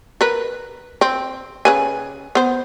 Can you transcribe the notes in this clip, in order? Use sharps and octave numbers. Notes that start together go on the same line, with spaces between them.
A#4 B4
C4
C#3 B4 G#5
B3 C5